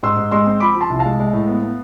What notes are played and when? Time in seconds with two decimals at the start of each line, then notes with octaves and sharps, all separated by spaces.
0.03 G#2 C6 E6
0.17 G#2
0.31 G#3 C6 E6
0.46 C4
0.60 F3 B5 D6
0.75 F3
0.81 A5 C6
0.90 C2
0.99 F5 A5
1.05 G#3
1.20 G#3
1.33 A2
1.48 B3
1.63 B3